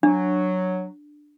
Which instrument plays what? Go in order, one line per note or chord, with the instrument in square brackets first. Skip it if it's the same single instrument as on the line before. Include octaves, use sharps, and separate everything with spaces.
[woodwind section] F#3 [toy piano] D4